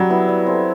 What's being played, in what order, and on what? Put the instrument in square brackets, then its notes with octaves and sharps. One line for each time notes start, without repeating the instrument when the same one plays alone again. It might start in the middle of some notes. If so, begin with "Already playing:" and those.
Already playing: [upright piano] F#3 [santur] G3
[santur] B3 E4
G3
C4 E4 A4